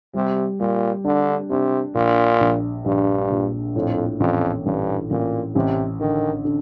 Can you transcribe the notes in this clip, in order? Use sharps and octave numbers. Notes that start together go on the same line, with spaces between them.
C3 G3
A#2 G3
D3 D4
C3 D4
A#1 A#2
A#1
A#1 G2
A#2
F2 A2
A1 F2
A1 G2
A1 A#2
A1 C3
D3 D#3
D3